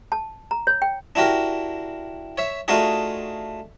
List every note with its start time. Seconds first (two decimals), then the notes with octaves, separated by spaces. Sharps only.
0.12 A5
0.51 A#5
0.67 C#5
0.82 G5
1.15 D4 E4 F#4 G4 A#4
2.38 C#5 E5
2.68 A3 D4 D#4 F4 F#4 G#4